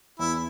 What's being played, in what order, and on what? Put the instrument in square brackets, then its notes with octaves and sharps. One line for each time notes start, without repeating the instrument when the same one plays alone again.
[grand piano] E2 [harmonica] E4